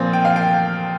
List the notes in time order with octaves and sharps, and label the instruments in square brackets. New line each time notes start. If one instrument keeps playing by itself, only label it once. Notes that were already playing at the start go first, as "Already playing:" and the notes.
Already playing: [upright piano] A#2 F3 C4
G5
F5
G5